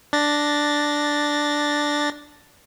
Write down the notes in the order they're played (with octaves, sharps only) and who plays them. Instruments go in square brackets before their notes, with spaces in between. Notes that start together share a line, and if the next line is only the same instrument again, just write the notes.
[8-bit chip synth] D4 A6 A#6